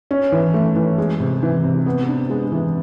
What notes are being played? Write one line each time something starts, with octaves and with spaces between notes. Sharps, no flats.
C#4
E3
A3
E3
G#3
C3
E3
C3
B3
D4
G#3
E3